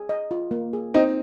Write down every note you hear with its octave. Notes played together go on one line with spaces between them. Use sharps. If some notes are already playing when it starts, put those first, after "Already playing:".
Already playing: G#4
D#5
F4
A#3
G#4
C4 D#4 D#5